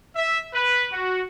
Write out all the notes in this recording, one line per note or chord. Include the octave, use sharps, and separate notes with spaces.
E5
B4
F#4